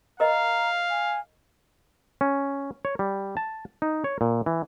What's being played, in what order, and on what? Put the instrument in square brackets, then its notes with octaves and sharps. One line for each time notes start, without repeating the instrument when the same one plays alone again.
[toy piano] A#4 D#5 [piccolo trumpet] F5 [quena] A#5
[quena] G#5
[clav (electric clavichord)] C#4
C#5
G3
A5
D#4
C#5
A#2
E3